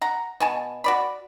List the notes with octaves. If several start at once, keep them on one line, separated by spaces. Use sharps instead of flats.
F#5 A#5
B2 G#5 A5
F#4 D5 B5